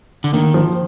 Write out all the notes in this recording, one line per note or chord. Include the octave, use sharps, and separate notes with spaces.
D3
D#3 A#3
F3